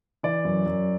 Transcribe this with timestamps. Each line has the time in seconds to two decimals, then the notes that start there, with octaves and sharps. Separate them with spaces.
0.23 E3 D5
0.45 F#2
0.66 F#2